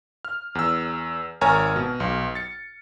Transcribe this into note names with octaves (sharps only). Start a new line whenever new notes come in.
F6
E2 E6
G#1 A#4 C#5 G#5 A#5 F6
B2
B1
A6 C#7